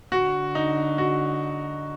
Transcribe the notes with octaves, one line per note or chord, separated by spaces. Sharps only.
D3 F#4
D#4
F#4